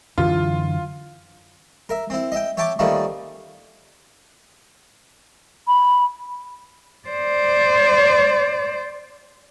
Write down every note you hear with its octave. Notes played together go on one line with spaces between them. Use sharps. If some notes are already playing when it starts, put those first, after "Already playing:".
F#2 D3 E3 F4
A#4 E5
C4 E4
D#5 E5 G5
C#5 E5 G5 A5 C#6 D6
D#3 F3 G3 A3 A#3 C#4
B5
C5 D5